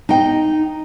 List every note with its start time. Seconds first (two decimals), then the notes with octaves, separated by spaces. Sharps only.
0.09 D#4 G5